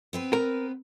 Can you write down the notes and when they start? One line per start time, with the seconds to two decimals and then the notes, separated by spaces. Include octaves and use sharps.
0.13 B3 C4 B4
0.33 A#4